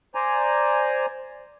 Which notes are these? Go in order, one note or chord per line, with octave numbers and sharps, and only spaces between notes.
C5 D5 G#5 A#5